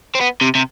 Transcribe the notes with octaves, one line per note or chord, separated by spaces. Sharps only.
C4
B3
C3
C3